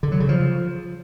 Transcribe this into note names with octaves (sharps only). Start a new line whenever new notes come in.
D3
F#3
C#3
F3